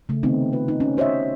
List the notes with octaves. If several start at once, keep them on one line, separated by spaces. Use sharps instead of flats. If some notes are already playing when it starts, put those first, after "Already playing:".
C#3 A3
C3 D#3 A3 B3 C4 D#4
F4 B4
D#4
C#4
F#4 C5 C#5 D#5 E5